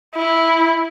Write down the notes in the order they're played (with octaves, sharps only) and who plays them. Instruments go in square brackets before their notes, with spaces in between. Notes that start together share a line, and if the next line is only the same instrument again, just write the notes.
[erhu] E4